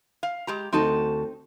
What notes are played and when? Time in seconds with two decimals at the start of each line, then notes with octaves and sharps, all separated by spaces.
0.23 F5
0.47 G#3 G4 A#5
0.73 D2 C4 D#4 F#4 A5